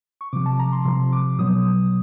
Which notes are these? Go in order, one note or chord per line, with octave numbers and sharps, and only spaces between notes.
C#6
C3 F3 D6
A5
A#5
C6
C3 F3 C6
D6
B2 F#3 D#6